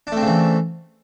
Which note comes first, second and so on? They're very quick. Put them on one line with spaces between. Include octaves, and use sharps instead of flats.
D4 A3 C4 C#3 E3